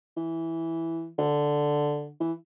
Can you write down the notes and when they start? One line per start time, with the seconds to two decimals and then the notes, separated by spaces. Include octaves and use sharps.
0.16 E3
1.18 D3
2.20 E3